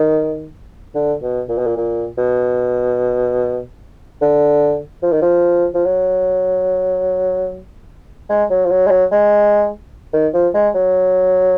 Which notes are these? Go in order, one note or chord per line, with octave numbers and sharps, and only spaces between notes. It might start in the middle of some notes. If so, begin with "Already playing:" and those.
Already playing: D#3
D3
B2
A#2
B2
A#2
A#2
B2
D3
F3
D#3
F3
F3
F#3
G#3
F#3
F3
F#3
G#3
F#3
G#3
D#3
F3
G#3
F#3